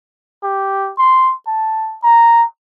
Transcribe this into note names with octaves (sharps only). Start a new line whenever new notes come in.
G4
C6
A5
A#5